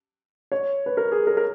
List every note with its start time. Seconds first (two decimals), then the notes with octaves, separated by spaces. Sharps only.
0.52 C#5
0.86 B4
0.97 A#4
1.12 G#4
1.27 A#4
1.37 A#4